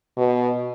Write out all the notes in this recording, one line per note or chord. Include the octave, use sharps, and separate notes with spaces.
B2